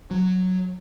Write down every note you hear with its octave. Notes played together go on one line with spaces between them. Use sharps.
F#3